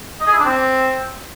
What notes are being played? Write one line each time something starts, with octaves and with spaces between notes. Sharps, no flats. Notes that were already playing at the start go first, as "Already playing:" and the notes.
D#5
G#4
E4
D4
C4